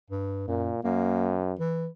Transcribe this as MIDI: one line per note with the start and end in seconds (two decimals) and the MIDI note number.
0.10 0.46 43
0.48 0.71 42
0.48 0.82 46
0.84 1.53 42
0.84 1.40 58
1.59 1.87 52